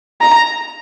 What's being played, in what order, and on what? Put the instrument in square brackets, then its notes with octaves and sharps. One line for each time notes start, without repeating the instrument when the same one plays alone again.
[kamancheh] A#5